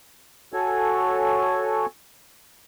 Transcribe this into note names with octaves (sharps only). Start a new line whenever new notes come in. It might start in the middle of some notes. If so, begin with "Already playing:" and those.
F#4 A4 C#5 G#5